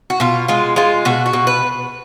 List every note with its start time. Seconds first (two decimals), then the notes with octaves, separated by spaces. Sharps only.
0.10 F#4
0.20 B2 F4
0.48 G#3 F4
0.76 G#3 F4
1.05 B2 F#4
1.26 F#4
1.33 B2
1.47 B4